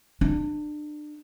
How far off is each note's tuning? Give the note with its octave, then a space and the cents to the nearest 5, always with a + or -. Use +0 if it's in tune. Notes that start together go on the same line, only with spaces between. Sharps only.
D4 +30